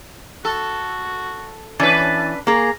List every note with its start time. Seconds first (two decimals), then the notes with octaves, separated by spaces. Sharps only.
0.45 F#4 A4
1.80 E3 C#4 D4 B4 A5
2.47 A#3 G#4 A#5